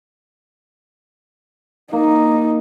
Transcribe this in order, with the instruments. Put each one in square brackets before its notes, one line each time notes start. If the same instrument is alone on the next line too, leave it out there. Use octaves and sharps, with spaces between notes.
[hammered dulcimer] A#3 [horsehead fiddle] D#4